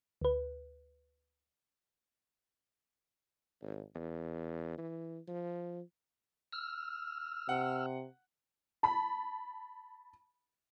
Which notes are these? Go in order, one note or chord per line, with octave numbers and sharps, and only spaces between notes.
D2 B4
G#1
E2
E3
F3
E6 F6
C3 F#5
A5 B5